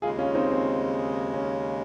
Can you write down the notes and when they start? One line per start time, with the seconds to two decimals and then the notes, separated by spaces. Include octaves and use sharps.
0.02 D#2 C#3 G#3 F4 G#4
0.19 C#4 F4
0.35 C4 D#4
0.52 C4
1.34 C#4